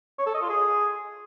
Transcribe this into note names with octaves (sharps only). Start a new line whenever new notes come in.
C#5
A4
D#5
F4
G#4